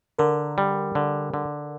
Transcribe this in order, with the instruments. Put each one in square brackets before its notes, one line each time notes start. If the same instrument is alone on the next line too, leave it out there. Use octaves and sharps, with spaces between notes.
[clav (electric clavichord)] D3 [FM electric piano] A#4
[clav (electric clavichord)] G3
D3
D3